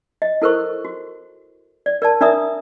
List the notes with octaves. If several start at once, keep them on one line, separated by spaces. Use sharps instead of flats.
D#5
E4 A4 A#4 C5 C#6
F#4
D5
A#4 D5 A5
D4 A#4 D5 E5 A#5 D#6